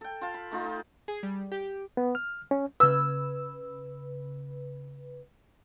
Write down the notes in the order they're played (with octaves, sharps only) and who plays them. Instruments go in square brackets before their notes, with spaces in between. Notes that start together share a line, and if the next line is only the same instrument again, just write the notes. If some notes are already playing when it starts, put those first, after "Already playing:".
[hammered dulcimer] A4 G5
F4 F5 A5
B5
A3 D#4 F4
D#4
[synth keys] G#4
G3
G4
[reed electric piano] B3
F6
C#4
[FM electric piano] C#3 B4 [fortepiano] E6